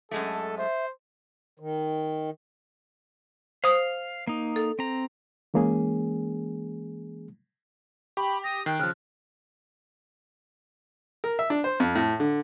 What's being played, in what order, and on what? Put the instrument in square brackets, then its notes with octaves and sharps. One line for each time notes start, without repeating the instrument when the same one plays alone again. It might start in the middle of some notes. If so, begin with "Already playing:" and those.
[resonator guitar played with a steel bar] F#2 G#3 A3 [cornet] A4
[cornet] C5 [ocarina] E5
[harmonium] D#3
[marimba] C5 D#6 [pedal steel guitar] F5
[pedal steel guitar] A#3 D#4
[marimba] A4
[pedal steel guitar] C4 A#5
[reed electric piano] E3 G#3 A#3 C#4 G#4
[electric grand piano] G4 [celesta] G5 C#6 [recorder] B5
[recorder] D#6 [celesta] A#6
[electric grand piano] D#3 [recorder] G5 [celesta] F#6 C7
[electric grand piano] C#3 F3 [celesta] F6 F#6
[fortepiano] A#4
E5
D4
C5
F2
A2
D3